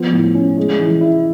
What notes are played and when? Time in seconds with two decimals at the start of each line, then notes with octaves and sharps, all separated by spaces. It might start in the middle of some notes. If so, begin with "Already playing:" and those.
Already playing: F3 B3
0.13 A2
0.35 C#4
0.58 G#3
0.80 E3
1.01 E4